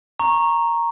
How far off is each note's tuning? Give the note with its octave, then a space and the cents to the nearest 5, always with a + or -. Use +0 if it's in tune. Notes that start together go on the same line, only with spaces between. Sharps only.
A#5 +0 C#6 -15